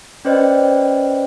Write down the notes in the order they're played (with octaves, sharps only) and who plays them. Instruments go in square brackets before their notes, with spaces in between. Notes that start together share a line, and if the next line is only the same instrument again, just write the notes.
[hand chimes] C#4 B4 C5 D5 D#5 G5